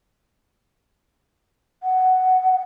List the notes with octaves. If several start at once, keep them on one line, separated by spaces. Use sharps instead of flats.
F#5